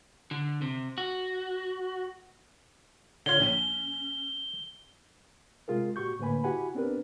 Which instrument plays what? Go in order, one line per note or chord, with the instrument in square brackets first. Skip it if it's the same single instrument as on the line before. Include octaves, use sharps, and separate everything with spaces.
[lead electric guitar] D3
C3
F#4
[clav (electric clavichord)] D3 F4 [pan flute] C#5 [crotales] G7
[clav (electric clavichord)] A#1 [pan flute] C#4
[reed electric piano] C3 G#3 F4 G#4 A#4
A#2 F#4 G4 C#6 G6
A2 D3 A#3 B4 G#5 B5
E4 F#4 G4 F#5 G#5 B5
B3 C4 D4 G4 A#4 B4